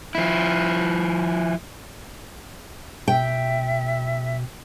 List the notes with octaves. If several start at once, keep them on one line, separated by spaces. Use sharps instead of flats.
F3 E4
B2 E5 G5